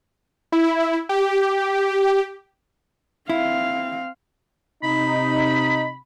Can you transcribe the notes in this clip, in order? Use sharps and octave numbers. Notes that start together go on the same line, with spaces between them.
E4
G4
C4 E4 F5
C3 D#4 B5